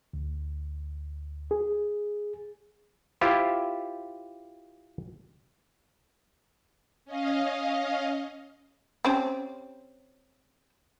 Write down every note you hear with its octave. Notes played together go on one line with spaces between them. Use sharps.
D2
G#4
E4 F4 G4 C5
C#4 D#5 F5
C4 C#4 G4